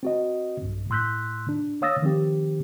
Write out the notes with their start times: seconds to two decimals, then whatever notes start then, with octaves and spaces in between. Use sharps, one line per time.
0.03 C4 F#4 D#5
0.62 B1 G2
0.90 A2 C6 E6 F#6 G6 B6
1.49 D4
1.82 C#5 F5 D#6 E6 A6 A#6
2.02 D#3 F3 C4 G4